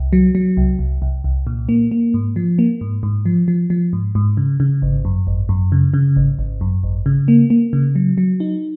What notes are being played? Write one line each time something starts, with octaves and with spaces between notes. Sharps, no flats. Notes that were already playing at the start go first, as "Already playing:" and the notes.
Already playing: C2
F#3
F#3
C2
C2
C2
C2
A#2
A#3
A#3
G#2
F3
A#3
G#2
G#2
F3
F3
F3
G#2
G#2
C#3
C#3
G#1
F#2
G#1
F#2
C#3
C#3
G#1
G#1
F#2
G#1
C#3
A#3
A#3
C#3
F#3
F#3
D#4